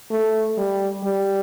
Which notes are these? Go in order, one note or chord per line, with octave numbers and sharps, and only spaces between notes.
A3
G3
G3